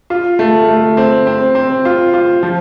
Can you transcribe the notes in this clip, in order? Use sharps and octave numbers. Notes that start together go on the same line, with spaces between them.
F4
A3
A3
C4
C4
C4
F4
F4
F3